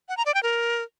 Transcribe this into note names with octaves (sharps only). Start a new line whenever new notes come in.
F#5
A#5
D5
G5
A#4